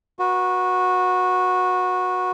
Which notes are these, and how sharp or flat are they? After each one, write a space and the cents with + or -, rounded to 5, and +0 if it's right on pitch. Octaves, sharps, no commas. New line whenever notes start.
F#4 -15 B4 -35